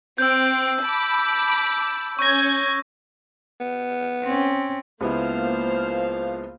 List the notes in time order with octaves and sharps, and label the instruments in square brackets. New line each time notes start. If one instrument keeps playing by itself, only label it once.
[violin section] C4 D7 [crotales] E6 G6
[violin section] A5 B5 D6
[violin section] C#4 G#6 [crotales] C#6 G6 A#6
[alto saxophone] B3
[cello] C4 C#4
[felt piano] C#2 B3 E4 [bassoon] F3 [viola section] A#3 C5 F5